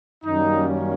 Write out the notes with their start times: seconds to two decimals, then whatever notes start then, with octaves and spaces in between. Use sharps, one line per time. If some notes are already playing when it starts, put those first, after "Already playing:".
0.24 F#2 D#3 G3 A#3 C#4 D#4